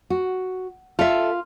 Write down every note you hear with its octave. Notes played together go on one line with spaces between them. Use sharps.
F#4
F4 A4 E5